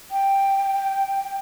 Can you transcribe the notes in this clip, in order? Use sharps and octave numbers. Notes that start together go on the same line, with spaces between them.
G5